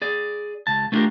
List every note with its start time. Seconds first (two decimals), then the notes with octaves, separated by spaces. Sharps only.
0.02 G#4 D5
0.67 C#2 A5
0.92 A3 B3 D4 F4 G4 A#4